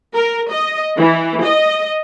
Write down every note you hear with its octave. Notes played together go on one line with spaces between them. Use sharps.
A#4
D#5
E3
D#5